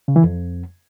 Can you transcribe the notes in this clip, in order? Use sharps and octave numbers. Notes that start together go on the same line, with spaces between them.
C#3
E3
F2